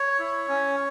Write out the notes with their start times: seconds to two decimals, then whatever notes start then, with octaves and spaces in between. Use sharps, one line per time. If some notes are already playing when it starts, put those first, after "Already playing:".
Already playing: C#5
0.19 E4
0.48 C#4